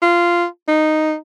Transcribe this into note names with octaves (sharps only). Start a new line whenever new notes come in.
F4
D#4